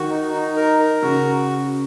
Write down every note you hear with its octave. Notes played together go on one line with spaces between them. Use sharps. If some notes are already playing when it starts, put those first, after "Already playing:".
Already playing: D#3 F#4
D#4
D#4
A#4
A#4
C#3 F#4